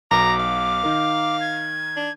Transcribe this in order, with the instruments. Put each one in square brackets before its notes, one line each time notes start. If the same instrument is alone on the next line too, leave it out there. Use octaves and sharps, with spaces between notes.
[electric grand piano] B1 B2 [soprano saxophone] A#5 [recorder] D6
[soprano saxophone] F5
[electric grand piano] D#3 D#4 A#4
[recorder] G#6
[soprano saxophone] D4